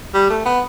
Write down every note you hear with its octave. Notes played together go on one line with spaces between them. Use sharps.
G3
A3
B3